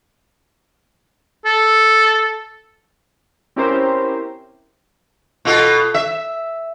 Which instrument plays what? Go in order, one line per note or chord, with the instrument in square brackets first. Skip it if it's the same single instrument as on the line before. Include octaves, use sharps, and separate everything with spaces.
[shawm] A4
[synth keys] C4 C#4 E4 G4 A#4 C5
[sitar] B2 F4 A4
E5